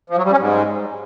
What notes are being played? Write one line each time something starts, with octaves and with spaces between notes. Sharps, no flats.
F3
F#3
G3
C#4
G#2